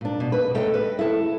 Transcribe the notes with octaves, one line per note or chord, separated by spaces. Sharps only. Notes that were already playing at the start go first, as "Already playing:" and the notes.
A#2 D4
B2
B4
A3 C#4 A4 D#5 G5
B4
E4 A4